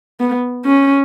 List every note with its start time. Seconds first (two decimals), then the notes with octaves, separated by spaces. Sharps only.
0.20 B3
0.65 C#4